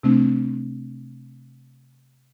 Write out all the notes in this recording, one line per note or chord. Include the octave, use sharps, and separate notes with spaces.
C3 A3 C4 D4